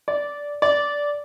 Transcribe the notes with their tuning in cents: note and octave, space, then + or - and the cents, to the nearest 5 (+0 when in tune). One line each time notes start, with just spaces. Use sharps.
D5 -10
D5 -10